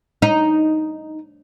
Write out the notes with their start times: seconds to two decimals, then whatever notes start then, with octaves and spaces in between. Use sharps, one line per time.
0.22 D#4